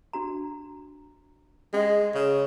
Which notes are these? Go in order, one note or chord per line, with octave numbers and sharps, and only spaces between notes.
D4 F#4 A#5
G#3 C#4 D#5
C#3